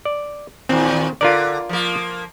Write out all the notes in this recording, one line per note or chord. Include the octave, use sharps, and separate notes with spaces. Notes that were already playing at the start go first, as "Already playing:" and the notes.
D5
D#2 A#2 C4
D3 F4 A#4 D5
F3 A#3